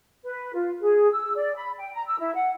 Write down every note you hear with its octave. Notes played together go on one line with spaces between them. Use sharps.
B4
F4
G#4
E6
D5
B5
G5
A#5
E6
E4
F#5